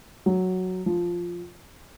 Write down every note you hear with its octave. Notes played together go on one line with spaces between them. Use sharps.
F#3
F3